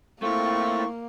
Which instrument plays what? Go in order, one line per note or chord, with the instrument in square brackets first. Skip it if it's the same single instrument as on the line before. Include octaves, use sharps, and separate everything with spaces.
[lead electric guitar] A3 E4 [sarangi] A#3 [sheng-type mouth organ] C4 F4 [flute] C#6